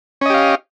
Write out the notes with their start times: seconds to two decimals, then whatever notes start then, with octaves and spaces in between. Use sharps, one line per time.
0.21 C#4
0.26 D#5
0.30 G4
0.34 F5